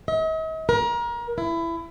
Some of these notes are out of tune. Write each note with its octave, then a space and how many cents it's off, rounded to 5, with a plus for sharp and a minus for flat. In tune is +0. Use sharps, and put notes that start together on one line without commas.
D#5 +45
A#4 +30
E4 +20